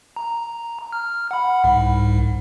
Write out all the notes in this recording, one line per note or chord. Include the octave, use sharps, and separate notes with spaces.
A#5
F6
F#5 B5
C2 G#2